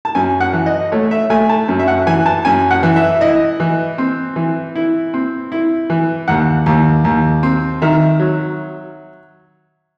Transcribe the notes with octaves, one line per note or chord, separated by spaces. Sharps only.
A5
F#2 G#5
F#5
E3
D#5
A3 C#5
E5
A3 G#5
A5
F#2
E5
F#5
E3 G#5
A5
F#2 G#5
F#5
E3
E5
E4 D#5
E3
C4
E3
E4
C4
E4
E3
D#2 F#5
D#2
D#2
C4
D#3 E5
F#3